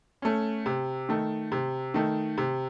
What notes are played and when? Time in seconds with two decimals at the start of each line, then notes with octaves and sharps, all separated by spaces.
0.22 A3 C#4
0.66 C3
1.09 D#3 A3
1.52 C3
1.94 D#3 A3
2.38 C3